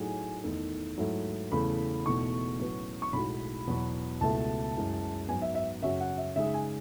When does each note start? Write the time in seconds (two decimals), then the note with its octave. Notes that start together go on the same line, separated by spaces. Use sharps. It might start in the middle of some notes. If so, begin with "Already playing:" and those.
Already playing: A2 F#3 A3 D#4 G#4 G#5
0.44 E2 D#3 A3 D#4 A4
0.98 G#2 F#3 A3 E4
1.51 E2 C#3 E3 A3 B5
2.05 E1 E2 B2 A3 D#4 C#6
2.59 A2 F#3 C#4 F#4 B4
3.02 C#6
3.13 B1 A2 G#3 D#4 F#4 B5
3.67 E2 B2 F#3 B3 F#4
4.21 C#2 B2 A3 E4 A5
4.75 F#2 E3 G#3
5.28 G#2 F#3 B3 G#5
5.42 E5
5.55 E5
5.82 F#2 C#3 F#3 C#4 F#4 E5
6.01 F#5
6.18 E5
6.36 C#3 G#3 D#4 G#4 E5
6.54 G#5